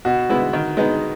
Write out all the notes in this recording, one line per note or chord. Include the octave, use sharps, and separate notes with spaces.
B2 F#4
G#3 B3 E4
D#3
G#3 B3 D#4